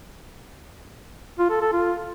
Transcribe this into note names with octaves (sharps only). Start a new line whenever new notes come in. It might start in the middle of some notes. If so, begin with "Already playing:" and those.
F4
A4
A4
F4